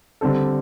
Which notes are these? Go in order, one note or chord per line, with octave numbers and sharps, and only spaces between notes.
D3 G3 C4 A4